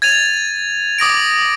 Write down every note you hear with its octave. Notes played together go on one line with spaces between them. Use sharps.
G#6 A6 D#7 F7
D6 D#6 A#6 D7